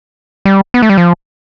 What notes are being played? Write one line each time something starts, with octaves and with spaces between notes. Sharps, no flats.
G3
B3
A3
G3
F3